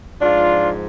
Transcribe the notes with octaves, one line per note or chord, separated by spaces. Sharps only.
G#2 F3 D4 F4